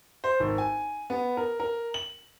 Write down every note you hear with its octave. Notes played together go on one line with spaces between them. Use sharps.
C5
G#1
G#5
B3
A#4
A#4
F#7